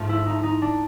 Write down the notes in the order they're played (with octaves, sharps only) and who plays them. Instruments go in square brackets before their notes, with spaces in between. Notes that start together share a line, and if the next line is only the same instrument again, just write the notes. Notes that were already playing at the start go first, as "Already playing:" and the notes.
Already playing: [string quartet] G#2 F3 A3
[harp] E4
D#4
D#4
D4